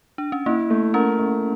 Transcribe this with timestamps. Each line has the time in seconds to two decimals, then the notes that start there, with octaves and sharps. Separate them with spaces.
0.18 D4
0.32 C#4
0.46 A#3 E4
0.70 A3
0.94 C#4 A#4
1.19 A3